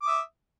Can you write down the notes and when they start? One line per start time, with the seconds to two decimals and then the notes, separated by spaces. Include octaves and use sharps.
0.02 D6
0.05 D#6
0.08 E5